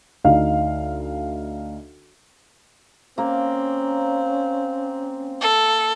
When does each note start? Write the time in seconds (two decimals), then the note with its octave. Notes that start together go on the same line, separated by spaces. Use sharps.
0.24 D2 D#4 F5
3.18 A#3 C4 C#4 F5
5.41 A4